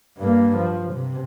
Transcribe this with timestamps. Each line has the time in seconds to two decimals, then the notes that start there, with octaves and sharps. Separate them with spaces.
0.18 G2 A#3
0.57 F3
0.93 C3